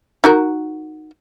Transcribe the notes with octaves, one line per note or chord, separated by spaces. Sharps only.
D#4 F#4 A#4